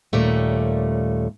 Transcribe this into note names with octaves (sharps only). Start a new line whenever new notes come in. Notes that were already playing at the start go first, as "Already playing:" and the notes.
D#2 A#2 G3 A3 C#4